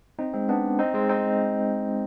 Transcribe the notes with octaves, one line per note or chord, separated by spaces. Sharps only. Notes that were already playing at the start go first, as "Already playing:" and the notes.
C4 D#4
G#3 C4
B3 D4
C4 D#4
G#3 C4
C4 D#4